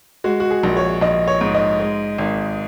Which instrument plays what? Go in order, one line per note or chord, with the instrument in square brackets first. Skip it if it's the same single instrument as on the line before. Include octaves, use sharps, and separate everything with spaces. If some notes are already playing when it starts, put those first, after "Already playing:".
[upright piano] G#3 F#4
F#4
G#4
A#1
C#5
A#1 D#5
C#5
G#2
D#5
G#3
G#1